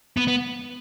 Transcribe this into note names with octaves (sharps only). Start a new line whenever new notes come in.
B3
B3